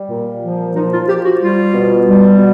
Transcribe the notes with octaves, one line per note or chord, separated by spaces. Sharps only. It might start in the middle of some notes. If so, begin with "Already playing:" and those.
Already playing: G3
A#2
F3
F3 D#4
F4
F3 G4
F#4
G3 F4
B2
G3
B2